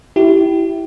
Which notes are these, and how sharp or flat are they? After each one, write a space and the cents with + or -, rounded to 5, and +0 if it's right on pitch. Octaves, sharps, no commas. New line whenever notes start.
E4 +0 G4 -20